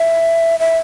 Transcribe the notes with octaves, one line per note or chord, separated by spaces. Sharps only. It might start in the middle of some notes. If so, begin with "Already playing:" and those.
Already playing: E5
E5